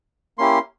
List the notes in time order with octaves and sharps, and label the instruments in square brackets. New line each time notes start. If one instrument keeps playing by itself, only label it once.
[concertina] A#3 C#4 E4 G4 C6